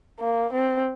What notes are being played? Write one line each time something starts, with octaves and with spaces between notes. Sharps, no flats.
A#3
C4